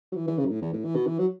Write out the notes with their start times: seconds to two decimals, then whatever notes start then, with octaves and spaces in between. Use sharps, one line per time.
0.12 F#3
0.16 E3
0.27 E3
0.38 C#3
0.45 F#2
0.50 A2
0.62 E2
0.73 A2
0.85 E3
0.96 B2
1.06 E3
1.19 F#3